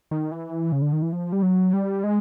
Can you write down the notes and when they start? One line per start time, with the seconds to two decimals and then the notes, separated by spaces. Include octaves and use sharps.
0.11 D#3
0.32 E3
0.72 C#3
0.82 D3
0.93 D#3
1.02 E3
1.13 F3
1.33 G3
1.43 F#3
1.73 G3
2.04 G#3